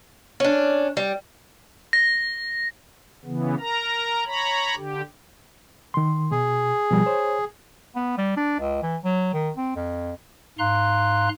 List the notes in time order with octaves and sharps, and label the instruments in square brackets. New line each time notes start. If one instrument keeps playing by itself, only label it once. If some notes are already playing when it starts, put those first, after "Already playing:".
[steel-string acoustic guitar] C#4 D4
G3
[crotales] A#6
[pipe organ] C#3 E3 B3
A#4 A#5
C#5 A#5 B5
D3 G4
[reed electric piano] D#3 C6
[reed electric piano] B2 [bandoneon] G#4
[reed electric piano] B2 F3 G3
C5 C#5
[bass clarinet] B3
G3
D4
C#2
E3
F#3
D#3
C4
F2
[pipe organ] G#2 F5 A#5 C6 F#6